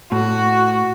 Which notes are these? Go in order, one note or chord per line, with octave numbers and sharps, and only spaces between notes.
A2 F#4